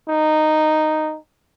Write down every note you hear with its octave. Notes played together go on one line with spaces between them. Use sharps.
D#4